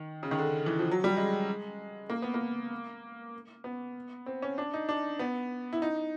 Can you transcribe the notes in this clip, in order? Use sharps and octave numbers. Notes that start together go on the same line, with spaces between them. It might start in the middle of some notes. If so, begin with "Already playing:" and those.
Already playing: D#3
C#3
D#3
D3
E3
F3
F#3
G3
G#3
A#3
B3
A#3
B3
C4
C#4
D4
D#4
D4
B3
E4
D#4